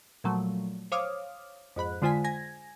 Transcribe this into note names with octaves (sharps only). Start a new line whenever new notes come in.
A#2 F3 F#3 A3
C5 C#5 F5 D6 D#6 F6
F2 G#2 B5 F#6
D3 G#3 F4 C5 G#5 B6
G#5 G#6 A#6